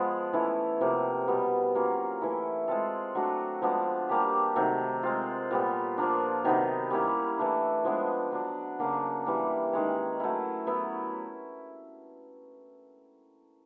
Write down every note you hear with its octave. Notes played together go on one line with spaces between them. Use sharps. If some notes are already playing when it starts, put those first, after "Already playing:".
Already playing: F3 G#3 B3
E3 A3 C#4 E4
C3 F3 A#3
B2 G3 B3
F#3 A#3 C#4 F4
E3 A3 C#4 E4
G#3 C4 F4 A4
F#3 A3 D4 F#4
F3 G#3 B3 D4
G3 A#3 D4 G4
C3 D#3 F#3 A3
G#3 C4 F4
A#2 G3 B3
F3 A#3 D4
C3 D#3 F#3 B3
G3 A#3 C#4 E4
E3 A3 D4
F3 G#3 B3 D4
F#3 B3 D4
C#3 F#3 A#3 D4
E3 G3 A#3
D#3 G#3 C#4
F#3 A3 C#4 E4
F#3 B3 E4